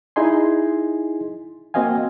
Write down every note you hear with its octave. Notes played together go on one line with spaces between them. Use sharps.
D#4 E4 G#4 D#5 G#5 C6
A#3 C4 F#4 D#5 F5 G#5